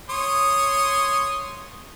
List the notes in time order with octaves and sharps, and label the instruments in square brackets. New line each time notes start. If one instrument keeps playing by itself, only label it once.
[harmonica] C#5 C6 D#6